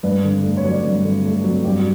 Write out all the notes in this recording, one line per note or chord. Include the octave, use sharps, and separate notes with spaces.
G2 B4
D3
A3
C#5
F#3
D5
G2
D3
A3
F#3
G2 G4
F#4